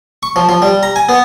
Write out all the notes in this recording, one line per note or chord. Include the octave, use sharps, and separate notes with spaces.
C#6
F3
F3
G3
A#5
G#5
B3